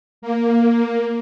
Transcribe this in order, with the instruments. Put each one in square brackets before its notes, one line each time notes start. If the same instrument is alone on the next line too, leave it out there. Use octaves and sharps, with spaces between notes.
[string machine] A#3